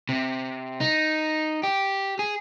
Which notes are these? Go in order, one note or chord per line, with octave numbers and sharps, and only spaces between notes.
C3
D#4
G4
G#4